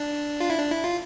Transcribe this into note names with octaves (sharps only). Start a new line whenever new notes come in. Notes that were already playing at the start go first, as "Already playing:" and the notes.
Already playing: D4
F4
E4
D4
E4
F4